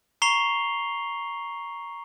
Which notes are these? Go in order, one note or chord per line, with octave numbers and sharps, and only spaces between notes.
A#5 C#6 C7 F7 G7